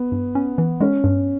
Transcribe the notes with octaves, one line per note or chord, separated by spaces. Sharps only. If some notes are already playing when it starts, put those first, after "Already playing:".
Already playing: B3
G2
C#4
E3
G#3 C#4
G2